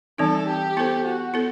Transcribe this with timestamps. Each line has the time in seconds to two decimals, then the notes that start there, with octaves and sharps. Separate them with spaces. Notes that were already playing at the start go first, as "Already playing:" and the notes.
0.18 E3 G3 C4 D#4 A4
0.47 G4
0.77 B3 E4 A4 C5
1.05 F#4
1.34 B3 E4 A4